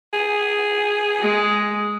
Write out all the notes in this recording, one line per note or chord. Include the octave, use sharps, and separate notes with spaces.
G#4
G#3